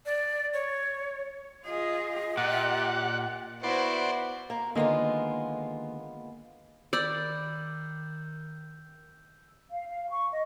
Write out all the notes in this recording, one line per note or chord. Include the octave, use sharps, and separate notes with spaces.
D5
C#5
F4 G#4 D#5
A#2 G4 F#5
B3 E4 F#4 C5 D5 C6
A#3
D3 D#3 G#3 A#3 B3 F4
D#3 D5 B5 E6 G6
F5
F5
C#6
D#5